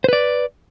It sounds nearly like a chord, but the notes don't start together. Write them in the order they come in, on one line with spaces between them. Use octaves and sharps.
C5 B4 D5